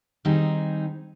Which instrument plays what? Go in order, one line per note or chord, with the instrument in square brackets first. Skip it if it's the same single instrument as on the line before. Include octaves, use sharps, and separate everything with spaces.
[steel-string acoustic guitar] D#3 G3 C4 D#4 G#4